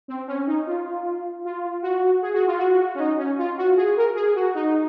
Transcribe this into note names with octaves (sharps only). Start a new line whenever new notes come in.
C4
C#4
D#4
F4
F4
F#4
G#4
F#4
F4
F#4
C#4
D#4
C#4
F4
F#4
G#4
A#4
G#4
F#4
D#4